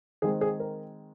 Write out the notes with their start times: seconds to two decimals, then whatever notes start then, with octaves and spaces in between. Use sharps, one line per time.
0.22 D#3 G#3 C4 G#4
0.41 G#4
0.60 A#4